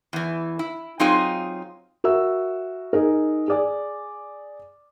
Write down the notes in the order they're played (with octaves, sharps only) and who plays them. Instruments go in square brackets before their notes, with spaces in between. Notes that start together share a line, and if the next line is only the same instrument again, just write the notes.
[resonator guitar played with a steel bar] E2 E3
E4
F#3 C4 D#4 F4 G#4 D#5
[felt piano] F#4 A#4 E5 E6
D#4 G#4 A#4
G#4 D5 G#5